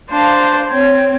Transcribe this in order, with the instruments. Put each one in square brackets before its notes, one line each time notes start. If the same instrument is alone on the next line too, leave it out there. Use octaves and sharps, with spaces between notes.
[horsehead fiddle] D4 C5 [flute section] F5 A5 A#5
[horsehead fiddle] C4 [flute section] C#5 G#6